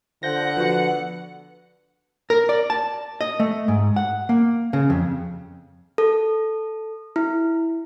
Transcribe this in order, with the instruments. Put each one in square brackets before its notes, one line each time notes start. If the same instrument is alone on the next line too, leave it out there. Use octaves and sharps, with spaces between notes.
[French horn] D3 [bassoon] F3 [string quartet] F#5 [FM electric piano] G6 A#6
[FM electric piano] F3 F#4 [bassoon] B3
[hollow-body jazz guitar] A#4
D5
A5
D#5
A3
G#2
F#5
A#3
C#3
F2
[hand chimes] A4
E4